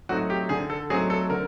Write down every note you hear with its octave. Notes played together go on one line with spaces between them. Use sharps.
F#3 A3 C4 D#4 F#4
G4
D3 G#4
A4
F#3 A3 C4 D#4 G#4
A4
D3 A#4